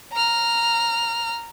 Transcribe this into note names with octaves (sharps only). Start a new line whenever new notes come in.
A#5 F6